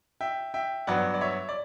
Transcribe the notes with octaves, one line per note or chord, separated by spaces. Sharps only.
E5 G5
E5 G5
G2 F#3 B3 D5 F#5
D5
C#5 E5
D5